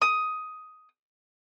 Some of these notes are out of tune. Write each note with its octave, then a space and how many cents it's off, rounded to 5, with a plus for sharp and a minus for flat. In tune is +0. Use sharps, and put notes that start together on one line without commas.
D#6 +10